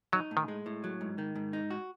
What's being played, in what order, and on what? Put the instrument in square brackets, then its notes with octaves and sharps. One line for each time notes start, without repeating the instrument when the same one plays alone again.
[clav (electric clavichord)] F#3 [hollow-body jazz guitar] D#4
[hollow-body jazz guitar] A2
[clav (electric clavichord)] D#3
[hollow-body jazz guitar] G#3
A2
F#3
G#2
D#3
G#2
D#4
F#4